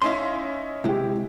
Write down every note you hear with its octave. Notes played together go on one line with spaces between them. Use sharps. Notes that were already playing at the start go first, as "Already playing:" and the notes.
C#4 D#4 E4 F5 A5 C6
C3 G#3 E4 G4